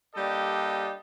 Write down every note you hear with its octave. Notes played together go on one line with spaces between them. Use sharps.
G3 A#3 D4 G4 A4 D#5